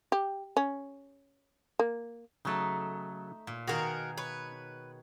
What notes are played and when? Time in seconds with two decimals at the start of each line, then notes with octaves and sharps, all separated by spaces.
0.12 G4
0.57 C#4
1.79 A#3
2.45 C#3 F#3 A3 D#4 A4
3.47 A#2
3.67 B2 D#3 F#4 G#4 A#4 F5
4.17 B4 C#5